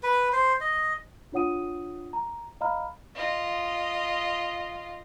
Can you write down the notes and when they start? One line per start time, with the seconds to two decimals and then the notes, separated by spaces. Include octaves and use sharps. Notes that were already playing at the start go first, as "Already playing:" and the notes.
0.03 B4
0.33 C5
0.61 D#5
1.32 D4 F4 C#5 F#5 D#6 D#7
2.13 A#5
2.61 D#5 F5 A#5 B5 F6
3.15 F4 D#5